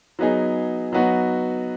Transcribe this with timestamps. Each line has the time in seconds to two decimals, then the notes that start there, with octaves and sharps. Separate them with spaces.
0.19 F#3 B3 D#4 G#4
0.92 F#3 B3 D#4 F#4